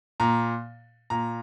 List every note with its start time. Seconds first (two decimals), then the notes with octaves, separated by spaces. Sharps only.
0.20 A#2 A#5
1.10 A#2 A#5